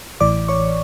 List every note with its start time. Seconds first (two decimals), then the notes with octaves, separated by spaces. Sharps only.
0.20 A1 A2 E3 D5 D6
0.48 C#5 C#6